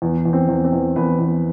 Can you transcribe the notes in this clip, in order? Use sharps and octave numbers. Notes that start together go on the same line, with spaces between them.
E2
E2
C4
E2
C4
E2
E2 B4
E2